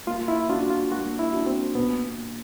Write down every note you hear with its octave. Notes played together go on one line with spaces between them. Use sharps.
A#3 F4
E4
D4 F4 F#4
F4
A#3 F#4
E4
D4 F#4
C4
A#2 B3